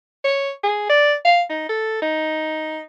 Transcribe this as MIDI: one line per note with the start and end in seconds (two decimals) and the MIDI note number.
0.24 0.51 73
0.63 0.85 68
0.89 1.14 74
1.25 1.42 77
1.50 1.64 63
1.69 2.02 69
2.02 2.80 63